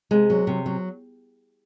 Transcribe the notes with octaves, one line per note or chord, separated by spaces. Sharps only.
C3 G#3
F#3
C3
F#3